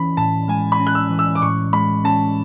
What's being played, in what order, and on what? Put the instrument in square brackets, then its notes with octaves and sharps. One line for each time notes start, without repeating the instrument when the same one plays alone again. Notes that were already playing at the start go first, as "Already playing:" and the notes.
Already playing: [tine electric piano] E3 C#4 [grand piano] B5
[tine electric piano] A2 [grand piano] A5
[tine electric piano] G#3 [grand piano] G#5
[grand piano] B5
[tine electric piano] C#4
[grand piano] F#6
E6
[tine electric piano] E3
[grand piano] E6
D6
[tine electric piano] A2 [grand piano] C#6
[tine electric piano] G#3 [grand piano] B5
[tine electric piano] C#4 [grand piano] A5